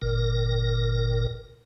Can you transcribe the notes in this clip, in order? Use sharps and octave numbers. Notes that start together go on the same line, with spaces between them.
G1 A#2 A#4